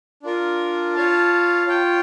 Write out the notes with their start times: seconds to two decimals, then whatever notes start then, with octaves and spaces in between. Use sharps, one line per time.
0.23 D4 F4 A#4
0.94 F4 C#5 F5 A5
1.67 F4 C#5 G5